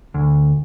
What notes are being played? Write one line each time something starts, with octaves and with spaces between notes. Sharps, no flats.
D2